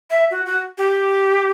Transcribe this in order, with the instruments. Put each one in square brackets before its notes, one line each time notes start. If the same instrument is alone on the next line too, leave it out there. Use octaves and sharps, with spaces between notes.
[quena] E5
F#4
F#4
G4